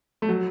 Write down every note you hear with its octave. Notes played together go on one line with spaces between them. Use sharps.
A3
F#3